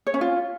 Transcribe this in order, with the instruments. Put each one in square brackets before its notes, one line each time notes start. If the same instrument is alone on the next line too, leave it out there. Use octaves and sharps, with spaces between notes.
[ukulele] C#5
C#4
F4